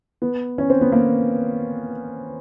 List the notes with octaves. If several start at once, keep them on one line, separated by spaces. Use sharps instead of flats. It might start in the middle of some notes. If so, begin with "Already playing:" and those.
B3
C#4
C4
B3
A#3